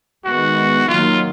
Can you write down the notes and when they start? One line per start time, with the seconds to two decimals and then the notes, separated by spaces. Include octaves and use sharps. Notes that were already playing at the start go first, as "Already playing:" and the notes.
0.25 D#3 G#3 B3 F#4
0.88 D#3 F#3 A#3 F4